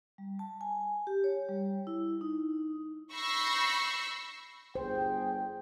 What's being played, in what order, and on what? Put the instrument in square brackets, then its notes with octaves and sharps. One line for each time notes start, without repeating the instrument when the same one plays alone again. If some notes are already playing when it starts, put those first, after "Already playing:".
[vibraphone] G3
A5
G#5
G4
C#5
G3
E4
D#4
[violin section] B5 C#6 E6 G6 A#6 C7
[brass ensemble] G1 G#4 G5 [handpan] C5